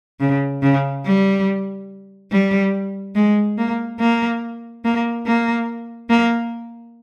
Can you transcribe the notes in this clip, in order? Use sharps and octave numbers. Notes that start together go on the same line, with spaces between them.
C#3
C#3
G3
G3
G#3
A#3
A#3
A#3
A#3
A#3